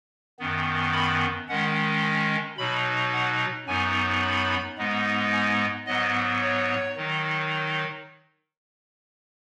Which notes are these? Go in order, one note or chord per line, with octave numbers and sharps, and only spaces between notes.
F#2 D#3 B3
B5
D#3 G#3 C#4 F#5
G#5
B2 F#3 D#4 B5
F#5
F#2 F#3 B3 D#4 G#5
B5
G#2 G#3 B3 D#4
G#5
G#2 F#3 B3 D#5
C#5
D#3 F#3 D#4